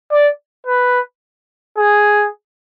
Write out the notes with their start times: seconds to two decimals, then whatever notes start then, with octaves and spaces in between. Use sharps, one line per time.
0.12 D5
0.67 B4
1.78 G#4